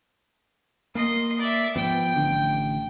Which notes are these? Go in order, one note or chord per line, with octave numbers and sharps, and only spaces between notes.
A#3 D#5 C6
D5 E5
G#2 F3 B3 G5
A1 D3